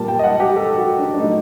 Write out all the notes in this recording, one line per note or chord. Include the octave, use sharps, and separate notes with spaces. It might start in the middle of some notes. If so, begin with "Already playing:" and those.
Already playing: A#2 G3 A#3 A5
G5
D#5
F#5
G4
A4
F#4
D4
D4
A#2 F#3 A3 D#4